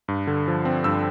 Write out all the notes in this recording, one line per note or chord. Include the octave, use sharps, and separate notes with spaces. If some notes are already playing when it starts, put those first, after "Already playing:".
G2
D3
F3
C4
G2 E6